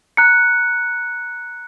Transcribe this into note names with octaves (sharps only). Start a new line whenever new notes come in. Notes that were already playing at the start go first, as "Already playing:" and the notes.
A#5 F#6 C#7